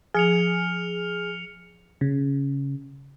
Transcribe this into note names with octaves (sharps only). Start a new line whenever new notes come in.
F3 G#4 F6 C#7 F7
C#3